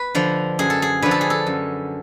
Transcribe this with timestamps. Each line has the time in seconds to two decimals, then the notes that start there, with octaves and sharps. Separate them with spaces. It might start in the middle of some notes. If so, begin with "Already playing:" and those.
Already playing: B4
0.15 D3 F3
0.59 F#2 G#4
0.70 A4
0.82 G#4
1.02 D3 F3 B4
1.11 A4
1.21 G#4
1.30 A4
1.47 F#2